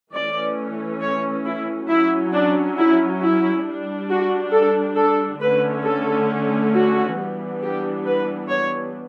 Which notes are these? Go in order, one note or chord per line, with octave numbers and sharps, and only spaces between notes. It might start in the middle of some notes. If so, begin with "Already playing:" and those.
E3 A3 C#4 D5
C#5
E4
F#3 C#4 E4
D4
E4
E4
G3 D4
F#4
A4
A4
D3 A3 C#4 B4
A4
F#4
E3 G3 B3 D4
G4
B4
C#5